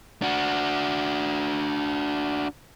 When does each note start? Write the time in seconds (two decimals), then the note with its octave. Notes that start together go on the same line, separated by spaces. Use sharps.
0.22 D4 F#4